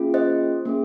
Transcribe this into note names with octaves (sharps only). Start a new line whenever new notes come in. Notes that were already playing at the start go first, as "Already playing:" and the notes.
Already playing: A#3 C#4 F4 G#4
C5 D#5
A#3 C#4 G#4